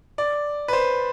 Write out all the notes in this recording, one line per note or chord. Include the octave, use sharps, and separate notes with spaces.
D5
B4
C5